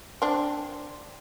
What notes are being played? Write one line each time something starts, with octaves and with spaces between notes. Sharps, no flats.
C4 D4